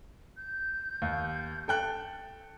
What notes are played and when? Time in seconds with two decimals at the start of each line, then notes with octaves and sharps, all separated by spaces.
0.37 G6
1.02 D#2
1.68 A4 G5 F#6